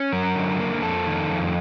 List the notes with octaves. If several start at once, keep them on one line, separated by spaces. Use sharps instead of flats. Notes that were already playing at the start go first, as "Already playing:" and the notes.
Already playing: C#4
F#3 A#4
D3
A#3
F2 A4
D#3
F2